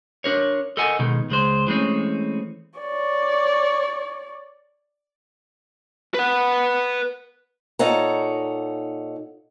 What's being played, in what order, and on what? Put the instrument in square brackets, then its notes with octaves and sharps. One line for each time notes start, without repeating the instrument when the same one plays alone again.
[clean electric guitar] D4 A#4 C#5
A4 A#4 D#5 F#5 G#5
B2 D#3 G#3
C#2 G#3 C5
E3 G#3 A3 C4 C#4
[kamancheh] C#5 D5
[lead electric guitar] B4 F#5
[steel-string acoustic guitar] A#2 D#4 A4 C#5 F#5 A#5